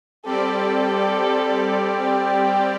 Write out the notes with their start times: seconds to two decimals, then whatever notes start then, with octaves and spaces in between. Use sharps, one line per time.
0.25 G3 C4 G4 A4 D5
2.01 G4